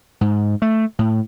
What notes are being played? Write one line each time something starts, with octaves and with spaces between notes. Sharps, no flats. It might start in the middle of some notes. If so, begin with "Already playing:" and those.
G#2
A3
A2